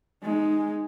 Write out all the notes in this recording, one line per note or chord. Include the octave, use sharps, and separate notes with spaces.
G#3 D#4